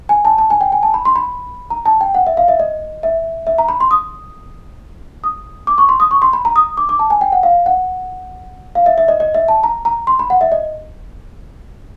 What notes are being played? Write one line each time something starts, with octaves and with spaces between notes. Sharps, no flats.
G#5
A5
A5
G#5
G5
G#5
A5
B5
C6
B5
A#5
A5
G5
F#5
E5
F5
E5
D#5
E5
E5
A#5
B5
C6
D#6
D#6
D6
C#6
C6
D#6
C#6
C6
B5
A#5
D#6
D6
D6
A5
G#5
G5
F#5
F5
F#5
F5
E5
E5
D#5
D#5
E5
A5
A#5
A#5
C6
B5
F#5
E5
D#5